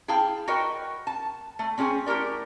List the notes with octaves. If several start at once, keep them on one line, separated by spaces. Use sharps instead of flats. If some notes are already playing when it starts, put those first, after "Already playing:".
E4 G#4 F5 G5 A5
F#4 A#4 B4 C#5 D#5 G5
A5
A3
C4 C#4 G#4 D5 G#5
A3 E4 G4 A#4 D5